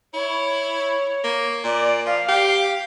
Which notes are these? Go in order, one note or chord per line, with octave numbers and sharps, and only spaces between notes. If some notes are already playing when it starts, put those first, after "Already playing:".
E4 C#5
A#3
A#2 D5
F3 F5
G4